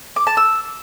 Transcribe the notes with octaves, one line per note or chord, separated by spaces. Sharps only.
D6
A5
E6